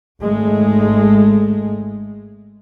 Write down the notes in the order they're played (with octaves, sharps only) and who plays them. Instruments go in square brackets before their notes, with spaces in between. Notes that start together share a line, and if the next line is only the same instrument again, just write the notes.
[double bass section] G#1 G#3 A3